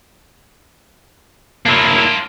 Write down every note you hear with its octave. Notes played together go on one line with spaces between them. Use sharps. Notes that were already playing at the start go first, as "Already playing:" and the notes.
A#3 D4 E4 F4